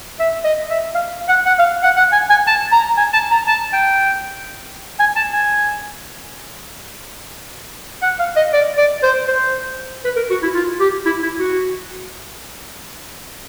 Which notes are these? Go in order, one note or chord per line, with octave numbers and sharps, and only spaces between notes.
E5
D#5
E5
F5
F#5
F#5
F5
F#5
F#5
G#5
G#5
A5
A#5
G#5
A5
A#5
A5
G5
G#5
A5
G#5
F#5
F5
D#5
D5
D5
C5
C5
B4
A#4
F#4
E4
F4
G4
E4
E4
F#4